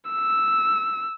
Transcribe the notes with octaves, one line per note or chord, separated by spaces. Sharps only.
E6